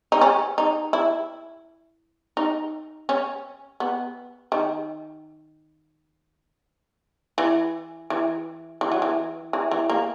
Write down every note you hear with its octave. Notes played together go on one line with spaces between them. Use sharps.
D#4
C#4
D#4
E4
D#4
C#4
B3
D#3
E3
E3
E3
F#3
E3
E3
E3
A#3